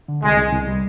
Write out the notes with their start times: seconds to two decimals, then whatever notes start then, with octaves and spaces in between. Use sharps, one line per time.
0.08 D3
0.22 C2 G#3
0.38 C2
0.53 C2
0.68 G3